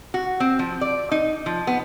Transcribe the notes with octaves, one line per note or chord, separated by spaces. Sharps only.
F#4
C4
F3
D5
D#4
F3
B3